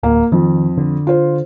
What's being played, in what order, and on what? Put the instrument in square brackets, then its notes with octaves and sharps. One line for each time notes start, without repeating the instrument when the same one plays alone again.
[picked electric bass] D1 [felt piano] A#3
[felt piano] F2 [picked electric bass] D#3
[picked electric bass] D3
[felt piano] F4 C5